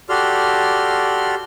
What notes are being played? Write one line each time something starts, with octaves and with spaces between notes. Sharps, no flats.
F#4 G4 A4 D5 C6 F6